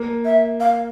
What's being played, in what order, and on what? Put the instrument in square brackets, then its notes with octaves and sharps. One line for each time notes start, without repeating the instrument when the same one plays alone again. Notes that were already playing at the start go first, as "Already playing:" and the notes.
Already playing: [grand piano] A#3
[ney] E5
F5